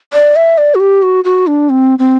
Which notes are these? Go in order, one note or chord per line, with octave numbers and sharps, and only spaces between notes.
D5
E5
D5
F#4
G4
F#4
F#4
D4
C4
C4